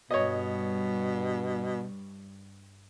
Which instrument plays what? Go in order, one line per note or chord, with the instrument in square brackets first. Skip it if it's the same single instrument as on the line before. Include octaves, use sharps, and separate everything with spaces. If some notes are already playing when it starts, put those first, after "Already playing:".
[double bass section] G2 G3 [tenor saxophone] B2 [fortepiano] C#5 D#5